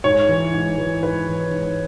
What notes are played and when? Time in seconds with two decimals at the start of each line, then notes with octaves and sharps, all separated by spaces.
0.04 G#2 C#5
0.29 E3
0.53 G#2
0.78 E3
1.03 G#2 B4
1.27 E3
1.51 G#2